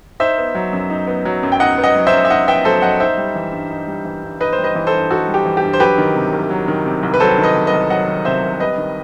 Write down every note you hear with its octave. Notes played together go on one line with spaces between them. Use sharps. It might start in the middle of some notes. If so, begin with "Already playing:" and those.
D#4 C5 E5
B3
F#3
F#2
D#4
B3
F#3
F#2
G5
D#4 D#5 F#5
B3
D#5 F#5
F#3
C5 E5
F#2
E5
D#4 D#5 F#5
B3 E5 G5
F#3 A4 C5
F#2 D#5 F#5
D#4 C5 E5
G3
E3
G2
D#4
G3
E3
G2
D#4 B4 D#5
C5
G3
B4 D#5
E3
A4 C5
G2
D#4 F#4 A4
G3
G4
E3
G4
G2
C5
F#3 G4 B4
D#3
C3
C2
F#3
D#3
C3
C2
B4
F#3 A4 C5
D#3
B4 D#5
C3
B4 D#5
C2
F#3 D#5 F#5
D#3
C3 C5 E5
C2
G3 B4 D#5
D#3